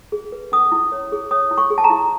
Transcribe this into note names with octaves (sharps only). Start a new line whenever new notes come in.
G#4
B4
C#4 D#6
E4
C#5
G#4
C#5 D#6
E4
C#6
G#4
A5
A#5
E4